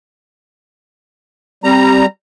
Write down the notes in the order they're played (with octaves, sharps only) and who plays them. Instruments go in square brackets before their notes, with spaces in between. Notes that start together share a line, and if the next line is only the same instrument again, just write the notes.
[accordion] G3 A#5 [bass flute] C4